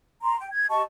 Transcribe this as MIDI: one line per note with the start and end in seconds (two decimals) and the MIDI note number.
0.23 0.38 82
0.23 0.38 84
0.38 0.49 79
0.52 0.66 92
0.69 0.81 67
0.69 0.81 75
0.69 0.81 81
0.69 0.81 85